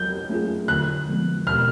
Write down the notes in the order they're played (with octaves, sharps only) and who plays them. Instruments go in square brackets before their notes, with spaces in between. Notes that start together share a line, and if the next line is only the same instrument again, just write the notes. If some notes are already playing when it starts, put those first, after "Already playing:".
Already playing: [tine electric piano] F#3 [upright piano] G6
[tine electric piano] A3 C#4 F4 G#4
[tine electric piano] D3 [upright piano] F#6
[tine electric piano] F3 G#3 B3
[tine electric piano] B2 [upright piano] F6